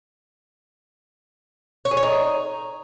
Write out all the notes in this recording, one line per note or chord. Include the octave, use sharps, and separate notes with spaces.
C#5
G#4
C#5
D#4